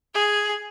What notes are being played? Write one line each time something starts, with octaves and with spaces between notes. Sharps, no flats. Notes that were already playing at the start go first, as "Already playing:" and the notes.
G#4